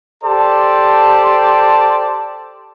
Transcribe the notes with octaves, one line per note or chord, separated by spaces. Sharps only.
G4 A4 C5 D5 A5